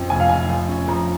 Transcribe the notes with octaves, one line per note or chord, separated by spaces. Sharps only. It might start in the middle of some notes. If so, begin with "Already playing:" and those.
Already playing: F2 F3 C#4
F1 G#5
F5
F1 G#5
F3
C#4
F3 A#5